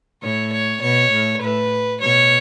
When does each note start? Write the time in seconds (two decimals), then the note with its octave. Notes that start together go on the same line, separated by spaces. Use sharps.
0.23 A2 C#5
0.52 C#5
0.82 B2 C#5
1.12 A2
1.41 A2 B4
2.01 B2 C#5